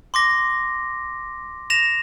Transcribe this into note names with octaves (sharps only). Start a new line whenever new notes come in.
C6 D6 A#6
A#6 E7 F7